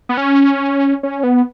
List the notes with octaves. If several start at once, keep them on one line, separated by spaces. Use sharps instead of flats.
B3
C#4
C#4
B3